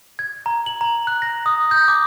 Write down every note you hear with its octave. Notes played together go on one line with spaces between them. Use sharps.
G#6
A#5
F#7
A#5
F#6
A#6
D#6
G6
D6